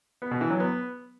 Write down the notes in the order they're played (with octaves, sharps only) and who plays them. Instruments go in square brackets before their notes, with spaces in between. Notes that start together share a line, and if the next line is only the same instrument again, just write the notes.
[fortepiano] B3
B2
E3
F#3
B3